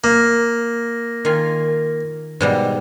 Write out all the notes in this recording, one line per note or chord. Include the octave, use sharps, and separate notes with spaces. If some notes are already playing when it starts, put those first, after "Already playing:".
A#3
D#3 F4 G#5
G#2 B2 G3